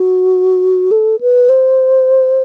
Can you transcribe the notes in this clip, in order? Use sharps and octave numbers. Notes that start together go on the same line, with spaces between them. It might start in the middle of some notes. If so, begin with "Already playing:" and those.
Already playing: F#4
A4
B4
C5